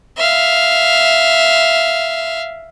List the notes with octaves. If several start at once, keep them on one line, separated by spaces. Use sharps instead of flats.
E5 F5